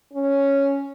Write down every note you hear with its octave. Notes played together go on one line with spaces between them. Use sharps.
C#4